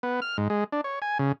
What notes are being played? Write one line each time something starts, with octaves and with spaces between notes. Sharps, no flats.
B3
F6
G#2
G#3
D4
C#5
G#5
C#3